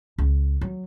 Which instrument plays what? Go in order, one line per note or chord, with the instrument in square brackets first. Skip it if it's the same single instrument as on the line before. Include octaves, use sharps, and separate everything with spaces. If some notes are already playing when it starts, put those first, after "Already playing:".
[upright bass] C#2
F#3